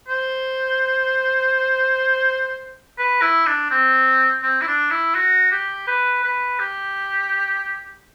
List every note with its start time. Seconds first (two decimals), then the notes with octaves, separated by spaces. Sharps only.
0.08 C5
2.98 B4
3.22 E4
3.46 D4
3.70 C4
4.42 C4
4.61 E4
4.67 D4
4.90 E4
5.15 F#4
5.51 G4
5.87 B4
6.24 B4
6.59 G4